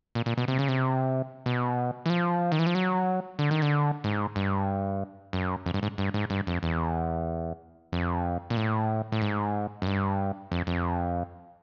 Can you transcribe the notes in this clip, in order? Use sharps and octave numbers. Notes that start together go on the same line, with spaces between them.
A#2
A#2
B2
C3
C#3
C3
B2
E3
F3
D#3
E3
F3
F#3
D3
D#3
D3
G#2
G2
F#2
F2
G2
G#2
G2
G#2
G2
F2
E2
F2
A#2
A2
A2
G#2
F#2
G2
F2
F2